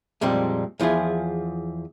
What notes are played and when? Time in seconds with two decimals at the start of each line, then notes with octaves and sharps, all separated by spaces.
0.21 F2 A#2 G3 G#3 C4
0.80 E2 F3 E4 F4 G#4